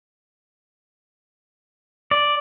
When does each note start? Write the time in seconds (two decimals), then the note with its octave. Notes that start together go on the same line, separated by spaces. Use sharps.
2.11 D5